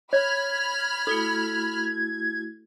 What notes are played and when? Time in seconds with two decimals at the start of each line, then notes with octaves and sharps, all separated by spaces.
0.13 C#5 B5 F6 G#6
1.07 A3 E4 F#4 A4